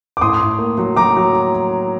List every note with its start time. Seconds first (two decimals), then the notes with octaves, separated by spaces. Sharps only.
0.17 D6
0.21 A2 C6 D#6
0.41 A2
0.59 A#3
0.78 F#3
0.96 F#3 A#5 D6
1.17 F#3